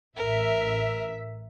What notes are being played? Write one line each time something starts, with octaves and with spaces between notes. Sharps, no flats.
A1 A#4 E5